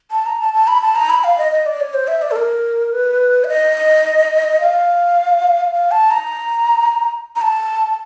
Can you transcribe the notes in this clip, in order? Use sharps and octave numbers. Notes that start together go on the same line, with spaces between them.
A5
A#5
A5
A5
B5
A5
A#5
B5
F5
D#5
D#5
D5
C#5
C5
E5
D5
A4
A#4
B4
E5
D#5
F5
F5
A5
A#5
A#5
A5